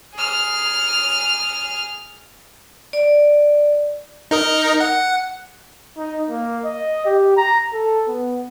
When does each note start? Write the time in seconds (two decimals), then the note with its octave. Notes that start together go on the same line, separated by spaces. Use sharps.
0.14 G#4 F6
2.93 D5
4.31 D#4 A#4 D#5
4.80 F#5
5.97 D#4
6.30 A#3
6.64 D#5
7.05 G4
7.37 A#5
7.73 A4
8.08 B3